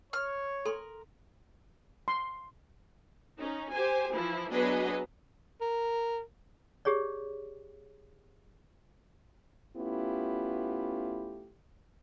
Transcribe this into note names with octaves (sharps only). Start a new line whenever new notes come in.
C#5 F6
A4 A#4 C6
C6
C#4 D#4
G4 C5 G#5
E3 F3 E4
F#3 B3 D4 G#4 B4 D#5
A#4
G4 G#4 C#5 D5
A3 B3 C#4 E4 F4 G4